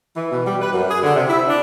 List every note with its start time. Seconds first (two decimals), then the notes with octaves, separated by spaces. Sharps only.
0.16 E3
0.31 B2
0.46 G3
0.61 B4
0.73 F#2
0.90 G#4
1.03 D3
1.16 C3
1.28 E4
1.47 D4